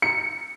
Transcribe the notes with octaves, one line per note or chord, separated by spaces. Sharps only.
C#7